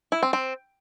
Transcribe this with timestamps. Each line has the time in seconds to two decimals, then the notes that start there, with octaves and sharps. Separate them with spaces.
0.12 E4
0.23 C4
0.33 C4